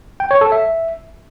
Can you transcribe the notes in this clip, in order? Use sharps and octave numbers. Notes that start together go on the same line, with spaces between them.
G5
C#5
A4
E5